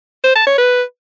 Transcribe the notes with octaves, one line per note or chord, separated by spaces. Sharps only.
C5
A5
C#5
B4